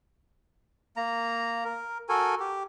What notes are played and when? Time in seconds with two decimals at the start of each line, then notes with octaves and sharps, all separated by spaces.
0.97 A#3 A#5
1.65 A#4
2.09 F#4 A4 A#4 G#5
2.40 G4